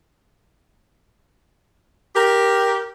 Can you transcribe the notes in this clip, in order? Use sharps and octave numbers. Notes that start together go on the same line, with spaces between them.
G4 A#4